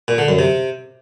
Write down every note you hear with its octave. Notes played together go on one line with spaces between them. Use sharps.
A#2
D3
F#2
C3